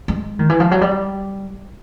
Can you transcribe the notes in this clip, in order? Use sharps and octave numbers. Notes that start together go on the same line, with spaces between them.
G#3
D#3
E3
F3
F#3
G3